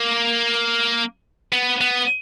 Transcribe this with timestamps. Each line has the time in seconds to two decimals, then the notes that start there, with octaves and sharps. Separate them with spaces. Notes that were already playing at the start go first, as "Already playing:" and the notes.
Already playing: A#3
1.53 B3
1.81 B3